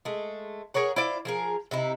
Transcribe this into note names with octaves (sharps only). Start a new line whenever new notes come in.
G#3 A3
G#4 A#4 C#5 F#5
E4 F4 C5 D5
F3 G#4 A#4
C3 D#4 E4